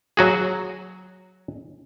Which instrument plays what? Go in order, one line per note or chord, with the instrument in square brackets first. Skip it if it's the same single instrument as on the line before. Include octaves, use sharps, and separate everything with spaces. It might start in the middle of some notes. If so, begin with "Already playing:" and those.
[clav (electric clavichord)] F#3 F#4 G#4